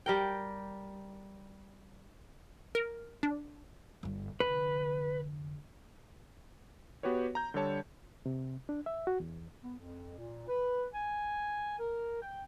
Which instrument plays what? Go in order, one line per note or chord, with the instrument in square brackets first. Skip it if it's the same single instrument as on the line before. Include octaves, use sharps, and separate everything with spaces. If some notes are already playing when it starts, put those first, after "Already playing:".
[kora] G3 A#4 G5
[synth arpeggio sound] A#4
D4
[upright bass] G1 G2
[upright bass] F1 D3 [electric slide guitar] B4
[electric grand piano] B3 F#4 G4 B4 C#5
A#5 G6
D3 G3 A4 C#5 A5
[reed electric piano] C3
D4
E5
F#4
E2
[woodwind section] B3
F2
A#2
B4
G#5
A#4
G5